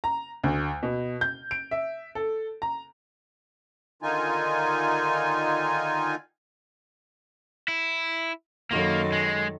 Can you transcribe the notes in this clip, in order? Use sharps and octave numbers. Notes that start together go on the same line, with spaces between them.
A#5
D2
B2
G6
D7
E5
A4
A#5
D3 D#3 D#4 F4 G#5
E4
F#2 D#3 A#3 A4
G#3